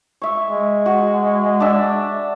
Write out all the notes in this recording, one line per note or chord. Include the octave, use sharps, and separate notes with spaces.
C#5 E5
G#3
F#4
D4 E5